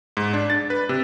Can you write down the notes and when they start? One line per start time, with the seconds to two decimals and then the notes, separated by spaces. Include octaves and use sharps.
0.17 G#2
0.33 D4
0.50 A6
0.70 B4
0.89 C3